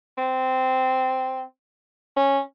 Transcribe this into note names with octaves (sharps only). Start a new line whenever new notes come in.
C4
C#4